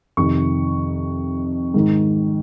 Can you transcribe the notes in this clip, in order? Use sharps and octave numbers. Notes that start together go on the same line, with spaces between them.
F2 C3 D#3 C#6
G#2 D#3